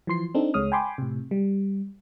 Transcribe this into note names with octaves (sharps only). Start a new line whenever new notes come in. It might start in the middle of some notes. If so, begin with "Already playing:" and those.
E3 F3 C6 C7
C4 D4 D#4 A4
C#2 G#3 C#5 D#6 F6
G5 G#5 B5 C6 D6
A2 C3
G3